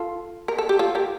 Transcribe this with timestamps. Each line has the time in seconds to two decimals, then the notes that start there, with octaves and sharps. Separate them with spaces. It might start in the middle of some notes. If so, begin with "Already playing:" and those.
Already playing: F4 A4
0.48 A#4
0.58 A4
0.69 G4
0.79 F4 A4
0.95 G4 A#4